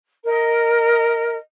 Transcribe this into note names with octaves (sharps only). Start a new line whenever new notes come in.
A#4 D#5